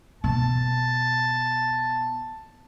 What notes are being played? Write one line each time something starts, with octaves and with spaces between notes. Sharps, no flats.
B2 A5